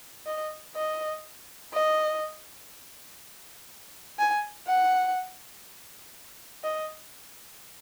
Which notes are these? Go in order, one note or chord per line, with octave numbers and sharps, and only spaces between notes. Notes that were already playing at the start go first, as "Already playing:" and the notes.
D#5
D#5
D#5
G#5
F#5
D#5